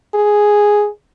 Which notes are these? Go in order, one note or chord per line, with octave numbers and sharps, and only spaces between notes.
G#4